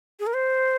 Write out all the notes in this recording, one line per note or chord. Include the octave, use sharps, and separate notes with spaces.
G#4
A#4
C5